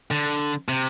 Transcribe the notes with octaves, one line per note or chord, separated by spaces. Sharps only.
D3
C3